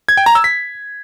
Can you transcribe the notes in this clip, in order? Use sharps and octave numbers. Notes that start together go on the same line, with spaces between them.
G#6
G5
A#5
E6
B6